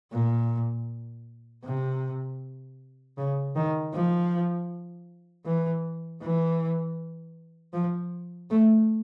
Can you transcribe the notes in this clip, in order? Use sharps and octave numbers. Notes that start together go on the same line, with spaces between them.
A#2
C3
C#3
D#3
F3
E3
E3
F3
A3